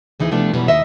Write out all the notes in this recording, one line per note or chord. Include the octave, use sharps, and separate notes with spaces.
D2 E3 D#4 G#4
C3 F3 A3 B3 D4
F#2 B2 E3 G3 B3
D#2 D#5 E5